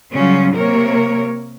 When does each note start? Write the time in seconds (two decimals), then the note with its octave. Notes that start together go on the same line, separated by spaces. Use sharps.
0.14 C#3 F#3 G3 C#4 F4
0.56 C3 A#3 A#4 C#5